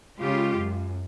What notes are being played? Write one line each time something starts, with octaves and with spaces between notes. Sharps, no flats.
C#3 G#3 F4 G4
F#2